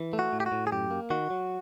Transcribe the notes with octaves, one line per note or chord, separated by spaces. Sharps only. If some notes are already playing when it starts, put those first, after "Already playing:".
Already playing: E3
A3
F#4
A2
G4
F#4
A2
G#4
F#2 G4
A#3
D#3 F#4
F#3